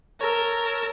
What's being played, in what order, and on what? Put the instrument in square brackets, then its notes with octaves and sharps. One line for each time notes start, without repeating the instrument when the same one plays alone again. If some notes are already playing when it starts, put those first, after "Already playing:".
[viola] A#4 [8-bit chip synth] C#5 A5 E6